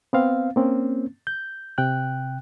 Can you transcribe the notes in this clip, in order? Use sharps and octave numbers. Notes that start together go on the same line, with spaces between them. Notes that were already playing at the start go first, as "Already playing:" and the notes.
B3 C4 F5
A#3 C4 C#4
G6
C3 G5 F#6